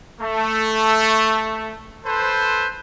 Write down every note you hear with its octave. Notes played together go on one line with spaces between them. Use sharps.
A3
A4 B4 C5